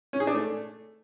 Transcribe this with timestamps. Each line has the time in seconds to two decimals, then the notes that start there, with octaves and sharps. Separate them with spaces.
0.13 C#4
0.20 G#4
0.27 D4
0.34 A3